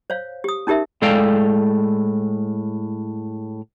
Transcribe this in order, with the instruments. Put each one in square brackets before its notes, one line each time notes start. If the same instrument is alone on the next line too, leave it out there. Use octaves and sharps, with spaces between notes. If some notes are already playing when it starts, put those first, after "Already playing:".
[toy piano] C5 C#5 F5
G4 D#6
C#4 D#4 G4 A#4 E5
[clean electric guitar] A2 G#3 A4 D5 F5 G5